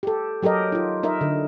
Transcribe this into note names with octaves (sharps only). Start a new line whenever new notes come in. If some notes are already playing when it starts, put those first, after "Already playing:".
G4 A4
F#3 G4 A4 A#4 D#5
D#4 F4
D#4 A#4 D#5 E5
D3